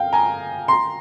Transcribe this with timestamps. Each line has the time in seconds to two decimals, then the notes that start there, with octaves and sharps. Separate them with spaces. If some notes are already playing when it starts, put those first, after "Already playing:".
Already playing: F5 G5
0.13 G#5 A#5
0.68 A#5 C6